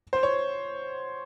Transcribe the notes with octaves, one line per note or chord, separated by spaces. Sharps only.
C5
C#5